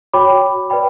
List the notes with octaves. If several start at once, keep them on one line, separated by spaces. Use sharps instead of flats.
F#4 C#5 G5 B5 D6
B4 D5 G5 B5